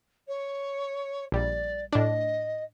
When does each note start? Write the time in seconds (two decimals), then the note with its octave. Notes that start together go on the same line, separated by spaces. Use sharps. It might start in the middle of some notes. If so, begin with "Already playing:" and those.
0.27 C#5
1.32 A#1 G3 D5
1.93 A2 D4 D#5